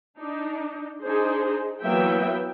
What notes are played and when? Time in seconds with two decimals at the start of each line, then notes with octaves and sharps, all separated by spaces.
0.18 D4 D#4
1.02 D4 D#4 G#4 C5
1.82 E3 F#3 A#3 B3 E5 G5